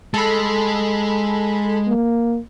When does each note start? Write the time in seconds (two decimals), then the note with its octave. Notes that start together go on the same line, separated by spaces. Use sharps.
0.14 G#3 A4 B5
1.88 A#3